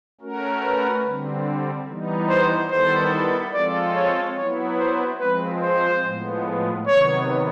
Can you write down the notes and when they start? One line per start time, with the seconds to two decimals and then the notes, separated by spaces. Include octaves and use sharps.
0.21 A3 C#4 F#4 A#4
0.63 B4
1.04 D3 G3 C4
1.87 E3 G3 B3 D#4
2.29 C5
2.70 D#3 G3 B3 E4 A4 C5
3.54 F3 G#3 C4 F4 A4 D5
3.95 C#5
4.37 F#3 B3 E4 C#5
4.79 C5
5.20 F3 G#3 C4 B4
5.62 C5
6.04 A2 F3 G#3 B3
6.87 C3 D#3 F#3 B3 C#5